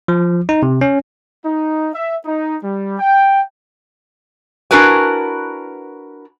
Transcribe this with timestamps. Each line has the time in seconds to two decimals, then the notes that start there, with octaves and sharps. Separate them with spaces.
0.08 F3
0.49 D#4
0.63 C3
0.81 C#4
1.44 D#4
1.94 E5
2.26 D#4
2.62 G3
2.99 G5
4.71 D4 E4 F#4 A#4 B4 G#5